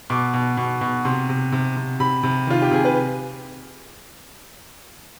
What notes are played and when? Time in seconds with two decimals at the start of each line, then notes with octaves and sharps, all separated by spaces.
0.10 B2 D6
0.34 B2
0.57 B2
0.81 B2
1.05 C3 C6
1.29 C3
1.52 C3
1.76 C3
2.00 C3 B5
2.23 C3
2.47 D#3 F4
2.62 G4
2.71 C3 G#4
2.84 B4